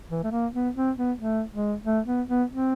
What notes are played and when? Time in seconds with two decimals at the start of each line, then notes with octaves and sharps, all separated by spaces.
0.10 E3
0.24 A3
0.31 A#3
0.54 B3
0.76 C4
0.97 B3
1.19 A3
1.52 G#3
1.85 A3
2.07 B3
2.28 B3
2.50 C4